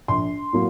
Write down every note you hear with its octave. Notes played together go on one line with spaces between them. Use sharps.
A#1 C6
A2 F#3 A#3